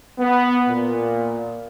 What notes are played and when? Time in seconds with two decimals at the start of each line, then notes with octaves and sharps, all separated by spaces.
0.19 B3
0.68 A#2